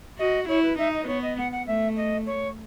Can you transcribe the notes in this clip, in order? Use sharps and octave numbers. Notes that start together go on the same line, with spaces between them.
F#4 D#5
E4 C#5
B4
D#4 E5
D#5
B4
B3 C#5
D#5
F#5
F#5
A3 E5
D#5
C#5